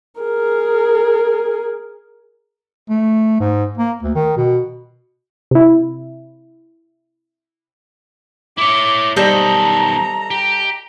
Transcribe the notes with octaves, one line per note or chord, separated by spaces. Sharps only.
G#4 A#4
A3
G#2
A#3
D2
D#3
B2
C3 E4
E4 C#5 D6
B1 D#3 G3 A4 C5 D#5 A#5
G4